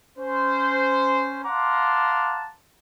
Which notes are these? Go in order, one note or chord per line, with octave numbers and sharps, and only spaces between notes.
C#4 C5
F5 F#5 A5 A#5 C6 D6